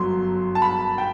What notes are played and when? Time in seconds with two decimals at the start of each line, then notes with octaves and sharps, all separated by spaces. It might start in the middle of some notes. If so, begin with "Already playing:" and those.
Already playing: G1 F#2 F#3 C6
0.55 A5
0.62 B5
0.98 G5